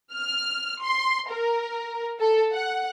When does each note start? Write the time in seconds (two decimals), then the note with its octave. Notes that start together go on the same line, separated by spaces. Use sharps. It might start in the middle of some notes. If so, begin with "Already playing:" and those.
0.13 F6
0.81 C6
1.30 A#4
2.20 A4
2.53 F#5